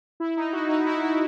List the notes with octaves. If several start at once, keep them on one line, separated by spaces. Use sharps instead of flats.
E4
D#4
F#4
D#4
E4
E4